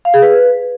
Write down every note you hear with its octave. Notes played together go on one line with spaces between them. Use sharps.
F5
G#4
B4